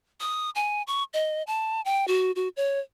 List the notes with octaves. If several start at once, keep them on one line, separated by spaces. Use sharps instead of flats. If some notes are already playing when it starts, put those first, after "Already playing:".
D#6
G#5
C#6
D#5
A5
G5
F#4
F#4
C#5